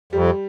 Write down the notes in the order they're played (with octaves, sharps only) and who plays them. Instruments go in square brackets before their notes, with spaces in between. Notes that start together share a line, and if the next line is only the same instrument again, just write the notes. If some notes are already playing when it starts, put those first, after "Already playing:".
[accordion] F2 [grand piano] G3